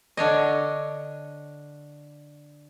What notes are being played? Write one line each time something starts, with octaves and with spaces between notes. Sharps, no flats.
D3 D4 C#5 D#5